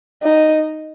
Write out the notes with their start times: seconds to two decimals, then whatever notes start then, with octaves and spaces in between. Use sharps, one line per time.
0.23 D#4